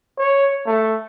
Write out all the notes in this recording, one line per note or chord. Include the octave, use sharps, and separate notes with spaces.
C#5
A3